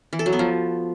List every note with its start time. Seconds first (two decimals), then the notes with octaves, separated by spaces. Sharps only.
0.13 E3
0.19 A4
0.26 F#3
0.33 B3
0.39 F3